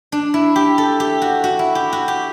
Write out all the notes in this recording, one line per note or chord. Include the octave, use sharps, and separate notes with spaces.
D4
E4
G4
A4
G4
F#4
F#4
E4
G4
F#4
G4